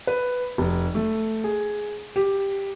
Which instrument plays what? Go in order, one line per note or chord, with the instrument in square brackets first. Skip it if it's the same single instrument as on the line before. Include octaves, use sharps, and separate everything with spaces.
[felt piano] B4
F1
A3
G#4
G4